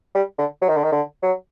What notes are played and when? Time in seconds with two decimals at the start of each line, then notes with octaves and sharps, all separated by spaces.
0.15 G3
0.38 D3
0.62 F#3
0.69 D#3
0.76 D3
0.84 D#3
0.92 D3
1.23 F#3